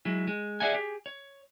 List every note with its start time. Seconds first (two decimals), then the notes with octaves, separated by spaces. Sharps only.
0.05 F#3 G#3 E4
0.27 G#3
0.60 G#4 C5 D5 E5 F#5 G#5
0.74 G4 G#4
1.06 C#5